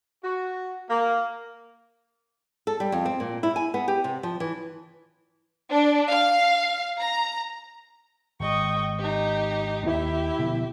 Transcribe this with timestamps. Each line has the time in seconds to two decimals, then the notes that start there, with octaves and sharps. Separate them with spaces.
0.23 F#4
0.89 A#3
2.67 A4
2.80 G3
2.92 F2
3.05 C4
3.20 A#2
3.43 E4
3.56 G#5
3.74 B3
3.88 G4
4.04 C3
4.23 F3
4.40 E3
5.70 D4
6.09 F5
6.97 A#5
8.40 G#1 D#5 G5 C#6
8.99 D#4 G4
9.86 D#2 E4 G4 E5
10.39 B2 D3 F3